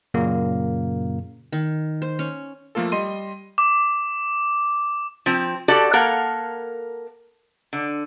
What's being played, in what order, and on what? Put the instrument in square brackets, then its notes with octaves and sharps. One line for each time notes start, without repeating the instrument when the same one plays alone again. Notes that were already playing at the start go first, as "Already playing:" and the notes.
[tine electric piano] F#2 A#2 C#3 A#3
[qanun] D#3
C5
C#4
[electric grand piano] F3 A3 A#3 F4 A4
G3 D#5 C6 D#7
[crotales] D6
[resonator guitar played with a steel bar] F3 C4
F#4 G4 A4 D5
A#3 A4 A#4 F5 F#5
D3